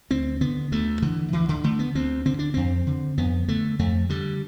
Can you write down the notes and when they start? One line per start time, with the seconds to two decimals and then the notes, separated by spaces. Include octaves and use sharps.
0.10 D2 C4
0.41 D3 B3
0.72 D2 A3
1.02 D3 E3
1.33 D2 E3
1.49 D3
1.64 D3 A3
1.79 B3
1.95 D2 C4
2.25 D3 C4
2.39 D4
2.54 F2 C4
2.87 D3
3.18 F2 B3
3.48 D3 A3
3.79 F2 A3
4.09 D3 G3